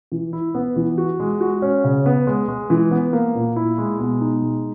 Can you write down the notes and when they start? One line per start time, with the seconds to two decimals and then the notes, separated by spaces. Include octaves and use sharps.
0.12 E3
0.33 E4
0.55 B3
0.76 E3
0.98 F#4
1.20 G#3
1.41 F#4
1.62 C#4
1.84 C#3
2.06 B3
2.27 G#3
2.48 G#3
2.70 E3
2.91 B3
3.13 A#3
3.35 A#2
3.56 E4
3.78 G#3
3.99 B2
4.21 D#4
4.42 G#3